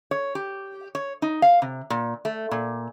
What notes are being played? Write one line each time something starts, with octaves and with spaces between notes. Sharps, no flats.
C#5
G4
C#5
D#4
F5
C3
A#2
A3
A#2